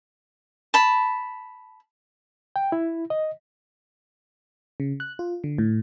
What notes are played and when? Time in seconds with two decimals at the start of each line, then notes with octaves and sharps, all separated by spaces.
0.74 A5 B5
2.56 G5
2.72 E4
3.10 D#5
4.80 C#3
5.00 F#6
5.19 F4
5.44 D3
5.58 A2